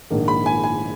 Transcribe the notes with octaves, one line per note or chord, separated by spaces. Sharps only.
A#1 G#2 D#3 A#3
B5
G#5
G#5